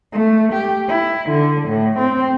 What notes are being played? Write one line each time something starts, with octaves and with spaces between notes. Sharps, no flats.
A3
G4
E4
D3
A2
C4